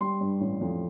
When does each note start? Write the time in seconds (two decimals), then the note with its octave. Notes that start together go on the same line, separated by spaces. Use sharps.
0.01 G3 C6
0.21 G2
0.41 A1
0.61 F2